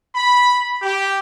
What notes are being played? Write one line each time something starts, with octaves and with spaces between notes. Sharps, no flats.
B5
G4